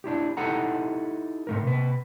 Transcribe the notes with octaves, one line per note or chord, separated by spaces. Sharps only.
D4 E4 G4
D#4 E4 G4 A4 F#5 A#5
G#2 A3 A#4
C3 B4